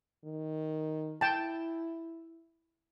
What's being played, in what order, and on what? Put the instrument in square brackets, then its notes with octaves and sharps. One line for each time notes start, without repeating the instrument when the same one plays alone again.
[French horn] D#3
[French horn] E4 [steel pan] G5 A5